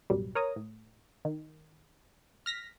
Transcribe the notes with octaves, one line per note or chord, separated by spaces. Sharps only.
A1 F#2 B2 F#3 G3
A#4 C#5 A#5 D#6
A2
D#3
F6 A#6 B6